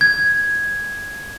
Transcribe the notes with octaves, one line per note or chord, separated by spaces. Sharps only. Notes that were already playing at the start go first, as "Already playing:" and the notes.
G#6